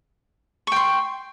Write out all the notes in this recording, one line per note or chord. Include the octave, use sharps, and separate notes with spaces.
G5 C6 C#6